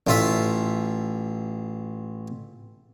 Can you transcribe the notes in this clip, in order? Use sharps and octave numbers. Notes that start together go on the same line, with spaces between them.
A1 F4 E5